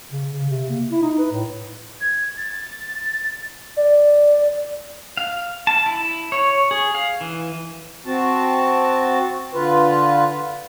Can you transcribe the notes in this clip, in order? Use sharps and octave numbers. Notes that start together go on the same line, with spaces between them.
C#3
C#3
C3
A#3
E4
D#4
B4
A2
G#6
A6
D5
F5
A5
E4
C#5
G#4
F5
E3
C4 F#4 A5
D3 F4 B4